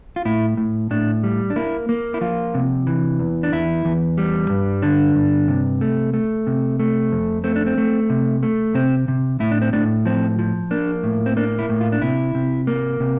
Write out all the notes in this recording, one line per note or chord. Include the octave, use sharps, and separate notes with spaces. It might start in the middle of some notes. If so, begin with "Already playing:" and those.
F4
A2 E4
A2
A2 D4
G3
D4
A#3 E4
A#3
E4
F3 F4
C3
E3
E2
D4
E2 E4
E2
G3
G2
D3 D4
G2
C3
A3
A3
C3
A3
F2
A3 C4
D4
C4
A3
C3
A3
C3 C4
C3
A2 E4
D4
C4
A2 D4
F3 C4
F3
A#3 D4
A2
C4
A#3 D4
E4
A2
F4
D4
C3 E4
C3
A#3
C3